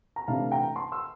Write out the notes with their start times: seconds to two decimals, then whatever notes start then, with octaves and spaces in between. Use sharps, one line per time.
0.16 A#5
0.28 C3 E3 A3 D4 F5 A5
0.52 G5 A#5
0.76 A5 C6
0.92 C6 E6